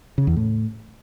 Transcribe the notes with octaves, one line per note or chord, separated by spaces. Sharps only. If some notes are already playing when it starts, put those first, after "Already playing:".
C#3
E2
A2